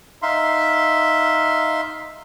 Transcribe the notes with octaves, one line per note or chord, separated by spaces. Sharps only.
D#4 E5 F5 C6